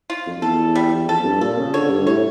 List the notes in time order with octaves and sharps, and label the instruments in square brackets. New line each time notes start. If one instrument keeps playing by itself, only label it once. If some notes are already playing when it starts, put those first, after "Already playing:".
[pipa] F4
[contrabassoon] F2
F2
[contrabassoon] E2 [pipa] A4
[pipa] G3
[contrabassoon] E2
[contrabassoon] F2 [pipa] A4
[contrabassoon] G2
[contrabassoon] A#2 [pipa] A4
[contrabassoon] C#3
[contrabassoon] D3 [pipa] C#5
[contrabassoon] G2
[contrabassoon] A2 [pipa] C#5